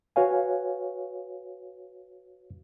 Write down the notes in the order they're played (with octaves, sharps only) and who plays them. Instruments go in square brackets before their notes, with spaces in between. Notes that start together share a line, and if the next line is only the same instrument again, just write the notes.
[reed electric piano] F#4 B4 C#5 F5 G#5